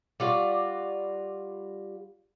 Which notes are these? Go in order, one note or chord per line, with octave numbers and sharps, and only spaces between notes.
G3 F4 F#4 D5